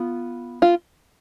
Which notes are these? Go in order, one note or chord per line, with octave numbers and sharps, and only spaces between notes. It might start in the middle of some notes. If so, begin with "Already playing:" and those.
Already playing: B3 F4
F4